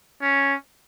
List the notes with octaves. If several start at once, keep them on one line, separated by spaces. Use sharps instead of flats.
C#4